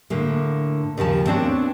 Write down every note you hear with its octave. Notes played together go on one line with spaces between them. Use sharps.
A2 D3 A#3
D#2 C#3 F3 A5
B3 C4 D4 F#4 C#5